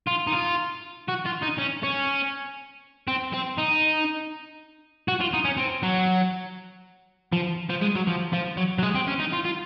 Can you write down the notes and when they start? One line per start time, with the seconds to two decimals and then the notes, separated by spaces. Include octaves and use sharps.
0.07 F4
0.27 D#4
0.32 F4
1.08 F#4
1.25 F4
1.42 D#4
1.58 C#4
1.83 C#4
3.08 C4
3.33 C4
3.58 D#4
5.08 F#4
5.21 F4
5.33 D#4
5.45 C#4
5.57 C4
5.83 F#3
7.33 F3
7.70 F3
7.82 G#3
7.96 F#3
8.07 F3
8.33 F3
8.57 F#3
8.79 F#3
8.83 G#3
8.95 C4
9.08 C#4
9.20 D#4
9.33 F4
9.45 F4